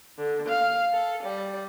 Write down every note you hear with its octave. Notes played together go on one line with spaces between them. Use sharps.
D3
F5
A4
G3